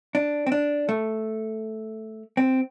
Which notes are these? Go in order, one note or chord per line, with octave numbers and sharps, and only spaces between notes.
D4
C4
D4
A3
C4